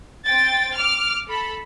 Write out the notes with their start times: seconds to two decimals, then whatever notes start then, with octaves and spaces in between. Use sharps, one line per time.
0.24 C4 G5 A6
0.76 D6 F6
1.27 A4 B5